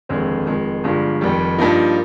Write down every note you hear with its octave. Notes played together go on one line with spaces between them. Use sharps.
F1 D#2 D3 G#3 C4
F1 F2 D#3 G#3
G1 G2 F3 G#3
F1 F2 D#3 G3
G2 F3 A#3 D#4